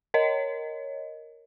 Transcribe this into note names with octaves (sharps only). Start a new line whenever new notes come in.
A#4 C#5 D#5